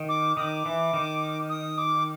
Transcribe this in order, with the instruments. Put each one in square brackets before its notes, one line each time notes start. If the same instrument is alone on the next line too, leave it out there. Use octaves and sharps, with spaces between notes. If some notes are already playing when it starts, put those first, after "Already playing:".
Already playing: [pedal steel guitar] D#3
[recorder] D6
[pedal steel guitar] D#3 [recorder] D6 D#6
[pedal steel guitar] E3
D#3
[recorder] D#6
D6